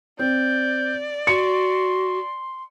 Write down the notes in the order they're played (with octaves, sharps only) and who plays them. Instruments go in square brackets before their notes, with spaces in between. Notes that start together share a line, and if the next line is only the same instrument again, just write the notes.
[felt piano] C4 [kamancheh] D5 [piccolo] G6
[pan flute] F#4 [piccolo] C6 [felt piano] C#7